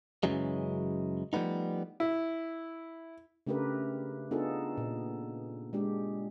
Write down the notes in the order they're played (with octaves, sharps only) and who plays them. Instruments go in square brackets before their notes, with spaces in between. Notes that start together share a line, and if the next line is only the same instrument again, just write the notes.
[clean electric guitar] F#2 C#3 E3 F#3 G#3
F3 G3 A3 B3 D#4
[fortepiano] E4
[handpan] C#3 A3 D4 G4 A#4 B4
B3 D4 D#4 F4 G#4 A4
A#2
G#3 D4 G4